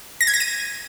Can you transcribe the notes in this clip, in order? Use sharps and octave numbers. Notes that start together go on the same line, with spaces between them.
A#6
G#6
A#6
D#7